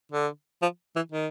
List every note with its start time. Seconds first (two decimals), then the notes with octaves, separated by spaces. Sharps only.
0.12 D3
0.62 F3
0.96 E3
1.12 D#3